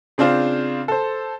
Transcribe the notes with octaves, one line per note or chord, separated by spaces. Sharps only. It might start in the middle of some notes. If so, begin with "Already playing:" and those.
C#3 C4 D4 F4 C5
A4 C5